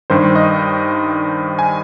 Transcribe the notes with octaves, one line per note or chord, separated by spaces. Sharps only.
G2 D#3 G3 C5
D#5
G#5